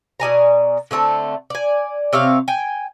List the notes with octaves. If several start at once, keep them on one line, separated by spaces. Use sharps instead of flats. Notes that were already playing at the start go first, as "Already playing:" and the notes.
B2 D5 G#5 A#5
D3 A3 C4 A5
D5 G#5
C3 C4 C#5 F5
G5 G#5